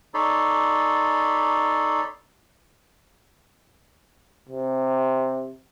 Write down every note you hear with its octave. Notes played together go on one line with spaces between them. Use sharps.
D#4 A4 C#5 D5 B5 C6
C3